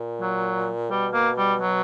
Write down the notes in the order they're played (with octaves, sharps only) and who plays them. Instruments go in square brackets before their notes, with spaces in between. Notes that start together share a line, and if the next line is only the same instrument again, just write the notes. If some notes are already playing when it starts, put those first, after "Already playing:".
Already playing: [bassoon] A#2
[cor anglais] F#3
[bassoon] B2 [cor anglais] G3
[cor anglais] A#3
G3
F#3